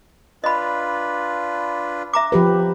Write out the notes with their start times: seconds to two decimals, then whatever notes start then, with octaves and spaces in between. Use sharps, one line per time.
0.44 D4 F4 B4 D#5 B5
2.13 E5 A#5 D6
2.32 F3 G4 B4